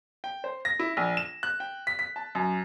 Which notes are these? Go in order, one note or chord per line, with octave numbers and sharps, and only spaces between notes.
G5
C5
A#6
E4
A#1
E7
F#6
G5
B6
B6
A5
F#2